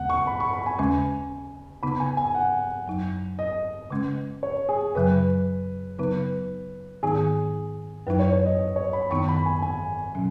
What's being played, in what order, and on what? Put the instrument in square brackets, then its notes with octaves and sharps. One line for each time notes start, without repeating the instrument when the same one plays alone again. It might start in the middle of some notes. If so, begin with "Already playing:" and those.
Already playing: [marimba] D#2 C#3 G#3 B3 [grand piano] F#5
[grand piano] C#6
B5
C#6
B5
G#5
[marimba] D#2 C#3 G#3 C#4
[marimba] C#3 B3 D#4 [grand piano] B5
[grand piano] G#5
G#5
F#5
[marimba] F#2 F#3 D#4
[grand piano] D#5
[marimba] C#3 G#3 C#4
[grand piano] C#5
G#4
[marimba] F#2 C#3 F#3 [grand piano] B4
[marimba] C#3 F#3 B3 D#4 [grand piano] B4
[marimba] G#2 D#3 B3 D#4 [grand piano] G#4
[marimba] F#2 F#3 D#4 [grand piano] B4
[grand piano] C#5
C#5
D#5
D#5
C#5
B5
[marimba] F#2 D#3 B3 D#4 [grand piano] C#6
[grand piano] B5
G#5
G#5
[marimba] B2 F#3 C#4